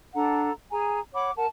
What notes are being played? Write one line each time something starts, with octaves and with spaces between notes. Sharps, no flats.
D4 A4 F#5 A#5
G#4 G#5 A#5
C#5 F#5 B5 D6
A#4 F#5 A5